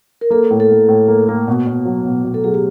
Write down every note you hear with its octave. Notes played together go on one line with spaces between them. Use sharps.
A#4
A#3 A4
A2
A4
A2
A2
A#3
A#3
B2 F#4
B2
F#3
B2
B2
A4
F#3 G#4
G4